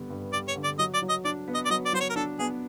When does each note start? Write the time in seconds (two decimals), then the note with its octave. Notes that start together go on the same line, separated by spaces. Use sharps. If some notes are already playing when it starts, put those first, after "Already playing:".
Already playing: G2 D3 G3 B3
0.10 G2
0.33 G3 D5
0.48 C#5
0.56 D3
0.64 D5
0.79 F#3 D#5
0.94 D5
1.02 F#3
1.09 D#5
1.25 D4 D5
1.48 B3
1.54 D#5
1.65 D5
1.70 F#3 D#5
1.86 D5
1.93 F#3 C5
2.00 C#5
2.10 A#4
2.16 D4 A4
2.39 B3 G#4